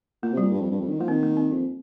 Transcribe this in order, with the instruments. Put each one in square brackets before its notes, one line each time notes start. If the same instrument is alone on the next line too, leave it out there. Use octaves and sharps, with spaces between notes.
[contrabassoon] A#2 [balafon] A#3
[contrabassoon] C3
[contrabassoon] A#2 [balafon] G3
[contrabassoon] G2
F2
G2
F2
D#3
[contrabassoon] F3 [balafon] A#3
[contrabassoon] D#3 [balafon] C4
[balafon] A#3
C4
[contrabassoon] F2